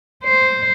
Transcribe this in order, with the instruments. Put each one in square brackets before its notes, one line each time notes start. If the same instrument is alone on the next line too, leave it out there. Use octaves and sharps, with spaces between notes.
[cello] C5